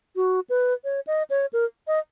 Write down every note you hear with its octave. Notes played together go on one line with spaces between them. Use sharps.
F#4
B4
C#5
D#5
C#5
A#4
D#5